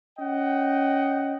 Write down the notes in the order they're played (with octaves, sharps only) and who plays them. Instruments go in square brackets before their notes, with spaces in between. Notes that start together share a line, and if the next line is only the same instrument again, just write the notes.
[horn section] C#4 D#5 F#5 G5